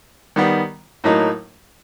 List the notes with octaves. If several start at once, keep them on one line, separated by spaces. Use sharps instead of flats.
D#3 G3 B3
A2 F#3 A#3 D#4